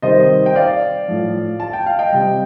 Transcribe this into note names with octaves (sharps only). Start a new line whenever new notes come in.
C3 D#3 G3 C5 D#5
G5
D5 F5
A2 F3
A5
G5
F5
D#5 G5
C3 G3